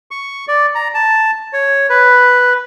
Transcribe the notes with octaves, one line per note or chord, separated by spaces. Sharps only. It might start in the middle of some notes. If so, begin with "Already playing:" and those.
C#6
D5
A#5
A5
C#5
B4